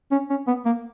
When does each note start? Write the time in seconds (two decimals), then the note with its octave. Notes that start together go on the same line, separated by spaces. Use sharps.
0.11 C#4
0.30 C#4
0.47 B3
0.65 A#3